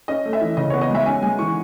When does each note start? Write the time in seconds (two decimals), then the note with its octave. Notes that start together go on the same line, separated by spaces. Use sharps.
0.08 C#4 D#5
0.25 A3
0.33 E5
0.41 E3
0.57 C#3 D#5
0.70 B3 C#5
0.81 D#5
0.90 G#3 E5
1.06 C#4 G#5
1.22 G#3 G#5
1.39 E3 C#6